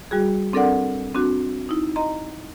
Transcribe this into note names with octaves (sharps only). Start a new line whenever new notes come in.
G3 F#4 G#4
C4 D4 A4 A#4 D5 F#5
C4 D4 F#4
D#4 E4
D#5 A#5 C6